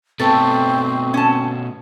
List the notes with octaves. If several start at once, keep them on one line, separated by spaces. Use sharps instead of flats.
B2 A3 C4 A4 B4 C#6
C#4 A5